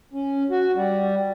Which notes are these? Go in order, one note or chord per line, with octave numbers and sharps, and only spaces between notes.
C#4
F#4
G3